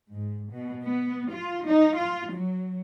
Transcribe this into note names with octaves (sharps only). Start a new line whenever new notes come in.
G#2
B2
B3
F4
D#4
F4
F#3